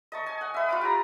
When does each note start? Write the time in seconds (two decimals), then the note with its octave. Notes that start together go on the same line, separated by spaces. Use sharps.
0.12 D#5 A5 C#6
0.26 G#5
0.41 F#5
0.54 B4 E5
0.69 F4 F5 D6
0.81 G4 A#5